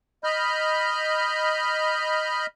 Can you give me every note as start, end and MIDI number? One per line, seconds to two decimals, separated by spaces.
0.24 2.46 75
0.24 2.46 83
0.24 2.46 89
0.24 2.46 91